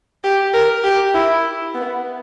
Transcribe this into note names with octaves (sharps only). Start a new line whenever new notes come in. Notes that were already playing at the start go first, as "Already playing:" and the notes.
G4
A#4
G4
E4
B3